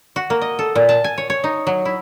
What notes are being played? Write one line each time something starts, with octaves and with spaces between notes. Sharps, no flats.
F#4
A#3
D#5
A4
A#2
A5
G#5
C#5
C#5
D#4
F#3
E4